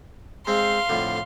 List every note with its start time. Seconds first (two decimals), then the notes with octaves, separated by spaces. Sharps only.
0.47 G#3 C4 F5 C6
0.89 F2 A2 D3